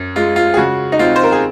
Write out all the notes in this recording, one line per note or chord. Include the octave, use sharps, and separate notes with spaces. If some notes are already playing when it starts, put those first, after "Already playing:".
Already playing: F#2
G#3 F4
F4
G#4
C#3 F#4
D#4
C4 F4
C5
A#4
G#4